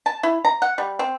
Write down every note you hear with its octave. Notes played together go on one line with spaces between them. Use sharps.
A5
E4
A#5
F#5
G3
C4